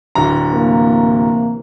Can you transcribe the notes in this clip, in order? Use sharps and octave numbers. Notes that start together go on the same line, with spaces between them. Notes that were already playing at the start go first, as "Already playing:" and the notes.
D1 D3 A#5
C3 E3 A#3